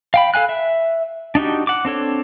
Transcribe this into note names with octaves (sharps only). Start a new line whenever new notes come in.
F5 G5 B5
A4 F5 G#5 F#6
E5
D4 D#4 F#4 G4
F#5 D6
C4 D4 A4 C#5